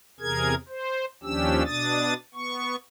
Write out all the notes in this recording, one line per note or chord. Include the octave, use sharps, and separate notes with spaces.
E2 C3 G#4 A#4 G#6
C5
D#2 F3 C#4 D4 G4 E6
B2 D4 D#6 A6
B3 C#6